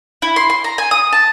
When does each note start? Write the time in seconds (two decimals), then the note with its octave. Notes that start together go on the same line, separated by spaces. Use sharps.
0.22 E4
0.36 C6
0.50 C6
0.64 A#5
0.78 G#5
0.91 D#6
1.13 A5